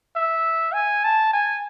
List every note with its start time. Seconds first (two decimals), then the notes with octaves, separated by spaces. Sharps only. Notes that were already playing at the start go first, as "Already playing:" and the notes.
0.16 E5
0.74 G#5
1.04 A5
1.33 G#5